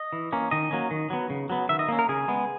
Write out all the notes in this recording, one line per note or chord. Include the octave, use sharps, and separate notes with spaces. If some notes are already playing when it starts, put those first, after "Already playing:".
Already playing: D#5
E3
A#3 C#4
D#3 D#5
F#3 A#3 C#4
D#3
F#3 B3
C#3
F#3 B3
D#3 E5
D#5
A#3 C#4
A#4
C#3 G#4
G#3 B3